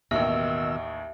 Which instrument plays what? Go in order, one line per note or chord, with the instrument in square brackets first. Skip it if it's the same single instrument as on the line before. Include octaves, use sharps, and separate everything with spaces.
[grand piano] A1 D#2 [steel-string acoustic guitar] B2 D#3 [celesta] E5 [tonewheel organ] E6